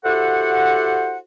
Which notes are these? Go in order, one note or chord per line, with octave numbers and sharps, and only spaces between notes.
E4 F#4 G4 A4 C5 F#5